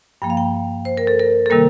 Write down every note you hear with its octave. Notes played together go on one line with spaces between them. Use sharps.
G2 F3 A#3 G5
F5
G5
C5
A#4
A4
A#4
A4
C3 D#3 G3 A#3 A#4